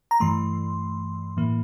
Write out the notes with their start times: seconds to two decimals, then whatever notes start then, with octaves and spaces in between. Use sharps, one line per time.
0.11 A#5
0.20 G2 E3 A3 C6
1.37 A2 E3 A#3